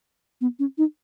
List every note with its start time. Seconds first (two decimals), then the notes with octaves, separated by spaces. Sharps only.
0.41 B3
0.59 C#4
0.78 D#4